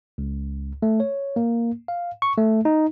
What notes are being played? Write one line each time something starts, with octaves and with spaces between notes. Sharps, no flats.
C#2
A3
C#5
A#3
F5
C#6
A3
D#4